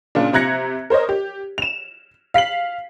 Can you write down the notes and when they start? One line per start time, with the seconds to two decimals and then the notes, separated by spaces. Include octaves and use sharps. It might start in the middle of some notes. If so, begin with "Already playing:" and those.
0.15 A#2 C#3 D4
0.33 C3 A#5 F#6 G#6 A#6 C#7
0.90 A#4 C5 C#5 D#5
1.09 G4
1.58 E7 F7
2.34 F5 B6 C7 F#7